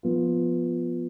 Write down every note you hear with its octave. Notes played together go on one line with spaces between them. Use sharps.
F3 B3 F4